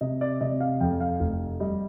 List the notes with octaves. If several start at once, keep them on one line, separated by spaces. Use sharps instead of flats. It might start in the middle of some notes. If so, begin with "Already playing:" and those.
C3 D#5
D5
C3 D#5
F5
F2 G5
F5
F1
G3 D#5